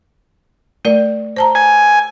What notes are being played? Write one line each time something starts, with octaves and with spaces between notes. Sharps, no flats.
A3 A#4 D5
C5 A5 A#5
G#5